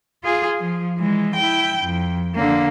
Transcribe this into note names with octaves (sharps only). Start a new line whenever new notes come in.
F4 G#4
F3
E3 G#3
E4 G5
F2
D3 A#3